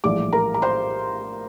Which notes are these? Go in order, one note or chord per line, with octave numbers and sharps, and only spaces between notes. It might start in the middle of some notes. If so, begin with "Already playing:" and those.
A#1 A2 E3 G3 D5 D6
A#4 A#5
A#5
C5 C6